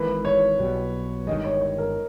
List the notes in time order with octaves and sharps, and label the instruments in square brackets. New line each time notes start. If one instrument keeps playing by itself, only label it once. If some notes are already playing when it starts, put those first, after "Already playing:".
Already playing: [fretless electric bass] G#1 G#2 E3 A#3 [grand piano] B4
[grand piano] C#5
[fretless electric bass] B1 B2 G3
[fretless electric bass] G1 G2 D#3 G#3 [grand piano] D#5
[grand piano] C#5
C#5
A#4